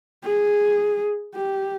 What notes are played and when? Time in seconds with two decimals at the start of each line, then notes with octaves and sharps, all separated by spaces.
0.25 G#4
1.35 G4